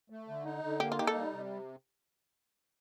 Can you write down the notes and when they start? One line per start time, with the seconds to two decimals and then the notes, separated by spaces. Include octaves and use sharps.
0.10 A3
0.28 D3
0.45 D#4
0.64 D3
0.80 A#3 G4
0.92 F4
0.99 D#4 G4
1.07 A4
1.15 G3
1.33 C3